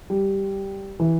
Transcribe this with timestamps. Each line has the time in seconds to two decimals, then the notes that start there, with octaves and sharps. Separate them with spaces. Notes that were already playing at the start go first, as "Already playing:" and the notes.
0.10 G3
1.00 E3